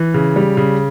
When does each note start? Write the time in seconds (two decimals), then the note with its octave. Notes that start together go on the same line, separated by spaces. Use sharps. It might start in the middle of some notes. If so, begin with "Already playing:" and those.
Already playing: E3
0.14 C#3
0.36 G3
0.57 C#3